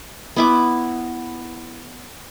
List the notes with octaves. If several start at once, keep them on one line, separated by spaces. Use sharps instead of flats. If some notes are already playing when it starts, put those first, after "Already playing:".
B3 E4 D6